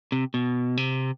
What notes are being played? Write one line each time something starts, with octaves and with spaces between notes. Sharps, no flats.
C3
B2
C3